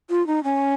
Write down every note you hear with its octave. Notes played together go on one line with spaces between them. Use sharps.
F4
D#4
C#4